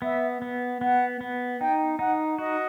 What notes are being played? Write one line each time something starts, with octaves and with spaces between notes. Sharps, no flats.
B3 E5
B3
B3 F#5
B3
D#4 G5
D#4 F#5
F#4 D#5